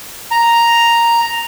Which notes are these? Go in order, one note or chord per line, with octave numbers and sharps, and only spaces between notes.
A#5